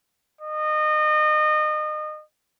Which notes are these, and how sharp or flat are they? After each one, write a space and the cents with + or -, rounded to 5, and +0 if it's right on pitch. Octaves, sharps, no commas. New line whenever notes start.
D#5 -30